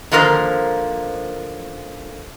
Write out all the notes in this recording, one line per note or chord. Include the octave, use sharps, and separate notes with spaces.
D3 D#3 F3 A#3 A#4 C5